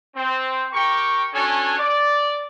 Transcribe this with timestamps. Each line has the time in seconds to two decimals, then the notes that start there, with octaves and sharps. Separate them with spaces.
0.16 C4
0.74 G4 A#4 G5 C#6
1.34 C#4 D4 F#4 A4 C#5 G#5
1.79 D5